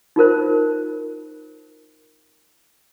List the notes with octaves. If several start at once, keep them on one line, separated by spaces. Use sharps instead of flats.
D#4 F4 A#4 C5